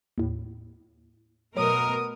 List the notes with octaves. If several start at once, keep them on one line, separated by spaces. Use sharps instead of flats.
D#2 A2
B2 F#3 A3 A#4 D#6